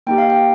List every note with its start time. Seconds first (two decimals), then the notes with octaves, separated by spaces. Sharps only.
0.07 A#3 D#4 G4 G5
0.18 F5
0.30 G5